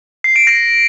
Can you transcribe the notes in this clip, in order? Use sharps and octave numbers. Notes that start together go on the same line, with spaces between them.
C7
D7
A#6